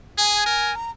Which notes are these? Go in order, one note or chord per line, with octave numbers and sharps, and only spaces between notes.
G#4 G#5
A#4
A#5